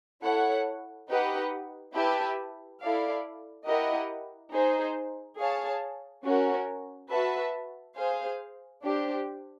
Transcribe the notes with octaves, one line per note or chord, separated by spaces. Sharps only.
E4 A4 C#5 F#5
D#4 G4 B4 D#5 F#5
E4 G4 B4 E5 A5
E4 A4 D5 F5
E4 G4 A#4 D#5 F#5
D#4 G#4 C5
G#4 C#5 F5 A5
C#4 F#4 A#4
F#4 B4 E5 A5
G#4 C5 F5
D4 G4 C5